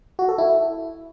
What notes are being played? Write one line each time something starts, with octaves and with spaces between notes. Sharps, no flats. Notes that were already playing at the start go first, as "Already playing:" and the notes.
F#4
A4
E4